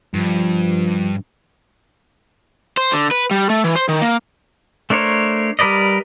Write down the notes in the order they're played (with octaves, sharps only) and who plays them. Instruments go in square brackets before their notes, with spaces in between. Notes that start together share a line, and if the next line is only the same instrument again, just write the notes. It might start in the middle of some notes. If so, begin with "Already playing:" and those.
[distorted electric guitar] G2 [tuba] F3
[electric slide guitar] C5
D3
B4
G3
A3
E3
C5
D#3
A#3
[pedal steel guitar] A3 D4 A#4 C5 C#5
G3 A#4 B4 D5 D#5